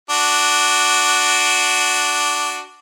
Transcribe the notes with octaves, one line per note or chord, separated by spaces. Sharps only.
D4 F#4